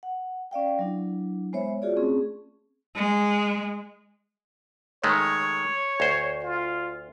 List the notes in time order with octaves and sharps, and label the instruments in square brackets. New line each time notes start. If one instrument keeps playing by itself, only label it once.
[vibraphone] F#5
C#4 D5 F5 G5
F#3 D4 E4
G#3 B3 C5 C#5 E5
F4 F#4 G#4 C#5 D5
A3 C4 C#4 G#4
[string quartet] G#3
[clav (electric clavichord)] D#3 G#3 A3 [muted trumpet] C#5
[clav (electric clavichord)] D2 C5
[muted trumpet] F4